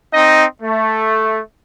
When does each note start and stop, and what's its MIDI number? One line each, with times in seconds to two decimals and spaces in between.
0.14 0.46 60
0.14 0.46 63
0.14 0.46 75
0.62 1.41 57